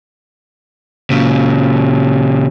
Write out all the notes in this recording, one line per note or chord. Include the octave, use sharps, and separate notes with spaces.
A#2 C#3